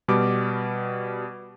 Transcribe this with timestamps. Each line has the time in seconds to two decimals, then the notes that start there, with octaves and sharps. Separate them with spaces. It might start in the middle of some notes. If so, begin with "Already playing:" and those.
0.08 B2 G3 D6